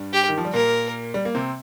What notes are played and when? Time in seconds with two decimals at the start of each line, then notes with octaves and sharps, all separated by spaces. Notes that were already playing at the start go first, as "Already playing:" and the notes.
Already playing: G2 G3
0.13 G4
0.29 D#3
0.37 F3
0.45 G3
0.53 A#2 A#3 A#4
1.14 G3
1.25 A#3
1.35 C3 C4